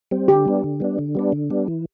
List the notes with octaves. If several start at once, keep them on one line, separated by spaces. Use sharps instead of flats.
G3 C4
D3 G4
G3 B3 D4
D3
G3 B3 D4
D3
G3 B3 D4
D3
G3 B3 D4
E3